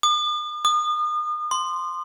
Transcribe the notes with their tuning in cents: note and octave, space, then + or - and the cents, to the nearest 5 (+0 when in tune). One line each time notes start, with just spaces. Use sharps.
D#6 -45
D#6 -35
C6 -5